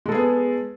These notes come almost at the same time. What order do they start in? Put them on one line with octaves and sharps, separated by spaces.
G#3 A4 G#4 B3